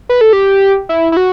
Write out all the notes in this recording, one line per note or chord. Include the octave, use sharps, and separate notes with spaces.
B4
A4
G4
E4
E4
F#4